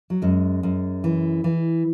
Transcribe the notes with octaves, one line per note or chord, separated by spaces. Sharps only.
F#3
F#2 G#3
F#2
E3
E3